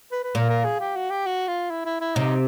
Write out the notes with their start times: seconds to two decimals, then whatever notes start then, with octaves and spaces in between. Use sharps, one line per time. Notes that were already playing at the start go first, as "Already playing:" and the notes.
0.12 B4
0.24 B4
0.35 A#2 A#4
0.49 A#4
0.65 G#4
0.80 G4
0.96 F#4
1.10 G4
1.26 F#4
1.48 F4
1.71 E4
1.85 E4
2.01 E4
2.15 C3 D#4